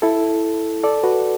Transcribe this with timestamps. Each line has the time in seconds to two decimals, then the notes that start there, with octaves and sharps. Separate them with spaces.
0.02 E4 A4
0.84 A4 D5
1.03 F#4 B4